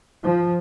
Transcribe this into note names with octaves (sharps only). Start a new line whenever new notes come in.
F3